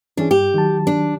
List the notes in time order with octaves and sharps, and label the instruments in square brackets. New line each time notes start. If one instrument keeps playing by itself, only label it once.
[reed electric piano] E3 C#4 G#4 [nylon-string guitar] D4
[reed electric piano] G2 [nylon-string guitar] G4
[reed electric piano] D#3 F#3 A5
[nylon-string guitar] D4